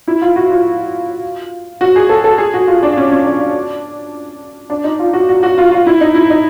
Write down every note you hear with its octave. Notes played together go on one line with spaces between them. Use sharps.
E4
F4
F#4
F4
F#4
G#4
A4
A4
G#4
F#4
F4
D4
C#4
C#4
D4
D4
D4
D#4
F4
F#4
F#4
F#4
F4
F4
E4
D#4
E4
D#4